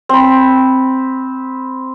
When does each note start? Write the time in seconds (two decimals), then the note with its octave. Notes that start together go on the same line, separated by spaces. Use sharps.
0.09 C4 B5